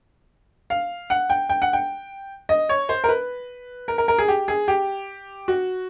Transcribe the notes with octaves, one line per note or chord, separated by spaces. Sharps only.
F5
F#5
G5
G5
F#5
G5
D#5
C#5
C5
A#4
B4
A#4
A#4
A#4
G#4
G4
G#4
G4
F#4